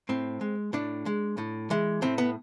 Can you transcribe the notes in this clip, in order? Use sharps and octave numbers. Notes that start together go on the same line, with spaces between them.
A2 C4
G#3
A2 D4
G#3
A2
E3 G#3
A2 C4
B3